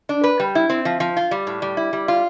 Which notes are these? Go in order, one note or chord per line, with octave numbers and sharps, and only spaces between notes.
D4
B4
G3
E4
C4
F3
F3
F4
G3
A2
G3
E4
G3
F4